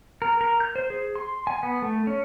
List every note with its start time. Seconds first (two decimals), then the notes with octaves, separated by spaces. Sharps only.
0.22 A#4
0.41 A#4
0.60 G6
0.76 C5
0.90 G#4
1.16 C6
1.47 G#5
1.63 B3
1.82 A3
2.07 C#4